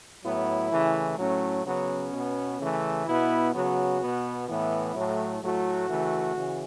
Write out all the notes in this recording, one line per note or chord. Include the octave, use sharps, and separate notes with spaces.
A2 F#3 B3 E4
C#3 E3 A3
A2 F#3 A3 C#4
C#3 F#3 B3 C#4
B2 B3
C#3 E3 A3
B2 B3 E4
C#3 F#3 B3 F#4
B2 B3
A2 E3 B3 E4
A2 F#3 A3
A2 F#3 A3 F#4
C#3 E3 A3
C#3 E3